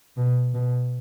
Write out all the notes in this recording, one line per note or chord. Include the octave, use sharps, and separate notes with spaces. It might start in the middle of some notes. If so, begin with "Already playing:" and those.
B2
B2